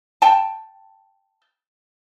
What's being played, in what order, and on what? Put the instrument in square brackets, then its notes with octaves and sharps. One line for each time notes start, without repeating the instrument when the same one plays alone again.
[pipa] G5 A5